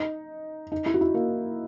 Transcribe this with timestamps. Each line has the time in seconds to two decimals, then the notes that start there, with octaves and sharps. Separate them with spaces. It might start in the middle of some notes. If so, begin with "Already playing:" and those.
Already playing: D#4
0.72 D#4
0.86 E4
0.94 F#4
1.01 E4
1.14 A#3